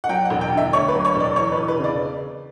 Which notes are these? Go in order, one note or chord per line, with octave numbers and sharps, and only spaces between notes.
F#5
F#3 G5
F#5
E1
G5
D3
E5
D2 C#5
B4
F#3
C#5
E1
D5
E3 C#5
B4
E1
B4
C#3
D5